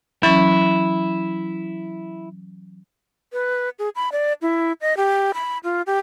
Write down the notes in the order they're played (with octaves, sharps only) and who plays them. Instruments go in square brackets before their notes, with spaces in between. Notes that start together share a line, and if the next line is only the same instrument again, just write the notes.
[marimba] E3 F#3 C#4 [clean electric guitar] E4
[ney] B4
G#4
B5
D5
E4
D#5
G4
B5
F4
G4